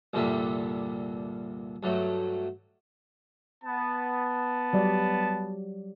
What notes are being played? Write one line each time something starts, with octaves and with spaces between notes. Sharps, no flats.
C2 G2 A#2 D3 G3 E5
G2 F#3 A3
B3 A5
F#3 G3 D5